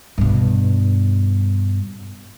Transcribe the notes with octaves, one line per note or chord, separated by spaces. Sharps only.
G2 B2